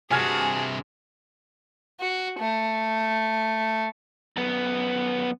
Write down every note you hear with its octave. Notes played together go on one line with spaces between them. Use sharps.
G2 C3 F#4 G#4 G#5 A5 F6 G#6
F#4
A3
F#2 B3